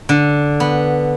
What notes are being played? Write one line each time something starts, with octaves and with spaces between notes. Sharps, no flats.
D3
B3